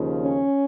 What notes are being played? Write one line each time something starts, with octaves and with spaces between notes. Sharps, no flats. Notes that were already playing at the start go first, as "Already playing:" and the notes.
Already playing: D#2 C#3 F3
C#4